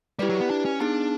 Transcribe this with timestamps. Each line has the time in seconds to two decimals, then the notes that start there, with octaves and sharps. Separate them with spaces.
0.19 G3 E4 G4 B4 D5
0.29 F#3
0.40 B3
0.50 D4
0.65 C#4
0.81 B3 D4 D#4 G#4